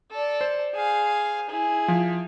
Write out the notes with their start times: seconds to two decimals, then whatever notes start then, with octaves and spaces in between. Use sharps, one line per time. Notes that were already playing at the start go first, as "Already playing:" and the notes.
0.11 A4 D5
0.41 C5
0.74 G#4 F5
1.49 E4 G#4
1.88 F3